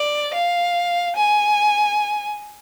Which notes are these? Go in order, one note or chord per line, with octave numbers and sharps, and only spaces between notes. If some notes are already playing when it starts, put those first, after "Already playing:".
Already playing: D5
F5
G#5